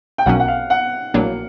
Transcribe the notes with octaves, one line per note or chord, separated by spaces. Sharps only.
G5
B1 B2 F#3 A#3 C#4 F#5
F#5
F5
F#5
A#1 A2 F#3 A#3 D4